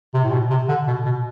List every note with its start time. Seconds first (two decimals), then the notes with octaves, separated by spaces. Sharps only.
0.14 C3
0.24 A2
0.32 B2
0.50 C3
0.68 D3
0.87 B2
1.05 B2